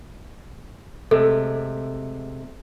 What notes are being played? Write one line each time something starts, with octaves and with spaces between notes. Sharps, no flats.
C3 G#3 A3 A4